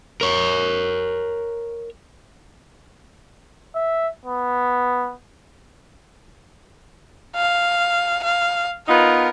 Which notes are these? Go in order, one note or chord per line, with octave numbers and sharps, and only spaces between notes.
A#4 C#5
E5
B3
F5
F5
B3 D#4 F4 A#4